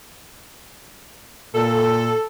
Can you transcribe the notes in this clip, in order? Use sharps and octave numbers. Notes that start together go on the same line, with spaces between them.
A#2 A4